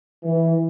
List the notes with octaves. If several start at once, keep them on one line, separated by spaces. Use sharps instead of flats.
E3